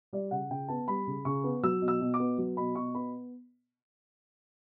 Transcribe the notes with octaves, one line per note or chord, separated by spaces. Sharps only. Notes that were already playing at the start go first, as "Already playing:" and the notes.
G3 D5
C#3 F#5
C#3 G5
B3 A5
G3 B5
C#3
C#3 C#6
B3
F#3 E6
B2
E6
B2
D6
B3
F#3
B2 B5
B2 C#6
B3 B5